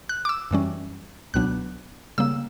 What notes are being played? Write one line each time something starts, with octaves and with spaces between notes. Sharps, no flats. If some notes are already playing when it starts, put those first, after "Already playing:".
F#6
D6
E6
F#2 E3 G3 C#4
C#2 B2 F#3 B3 D4 F#6
C#3 G3 A#3 E6